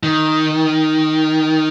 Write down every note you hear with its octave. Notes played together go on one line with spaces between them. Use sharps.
D#3